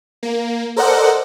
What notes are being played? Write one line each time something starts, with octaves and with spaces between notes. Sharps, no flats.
A#3
A4 A#4 C5 D5 D#5 F#5